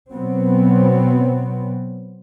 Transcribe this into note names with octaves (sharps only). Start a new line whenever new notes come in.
B2 F#3 B3 C4